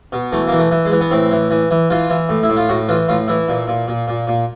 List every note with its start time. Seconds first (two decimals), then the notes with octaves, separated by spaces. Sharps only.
0.12 B2
0.32 E3 A3
0.48 E3 A#3
0.59 A3
0.71 E3
0.85 G#3
0.92 E3
1.01 B3
1.11 A2 C4
1.31 E3
1.50 E3
1.71 E3
1.90 E3 F4
2.10 E3
2.29 A2
2.43 E4
2.49 A2
2.56 F4
2.69 A2 F#4
2.89 E3 F4
3.08 A2 F4
3.28 E3 E4
3.48 A#2
3.67 A#2
3.88 A#2
4.08 A#2
4.27 A#2